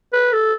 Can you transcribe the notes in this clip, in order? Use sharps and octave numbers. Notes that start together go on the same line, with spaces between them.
B4
A4